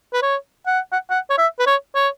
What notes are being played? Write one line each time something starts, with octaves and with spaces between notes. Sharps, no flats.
B4
C#5
F#5
F#5
F#5
C#5
E5
B4
C#5
C#5